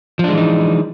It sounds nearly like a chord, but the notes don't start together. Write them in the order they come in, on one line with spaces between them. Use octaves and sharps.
F3 D4 G#3 E3 D#4